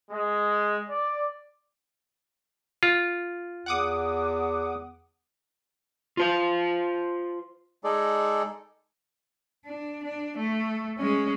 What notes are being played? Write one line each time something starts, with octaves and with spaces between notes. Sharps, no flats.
G#3
D5
F4
E2 F#5 D6 D#6
F4 C5 F5
G#3 D#4 G#4 A4 D5
D4
D4
A3
G#3 C#4